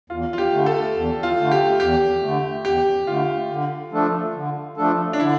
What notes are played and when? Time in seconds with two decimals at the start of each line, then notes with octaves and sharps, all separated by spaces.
0.10 E2 F4
0.33 F4
0.38 G4
0.52 D3 A3
0.66 A4
0.95 E2
1.23 F4
1.38 D3 A3
1.51 G4
1.80 E2 G4
2.22 D3 A3
2.65 E2 G4
3.07 D3 A3 F4
3.50 D3
3.92 F3 A3 D4 A4
4.35 D3
4.77 F3 A3 D4 A4
5.13 D4
5.20 D3 E4